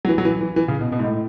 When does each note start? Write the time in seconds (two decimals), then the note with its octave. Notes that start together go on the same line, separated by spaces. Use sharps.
0.05 F#3
0.09 E3
0.18 F#3
0.25 E3
0.41 E3
0.56 E3
0.68 C#3
0.81 B2
0.92 B2
0.99 G#2
1.04 A2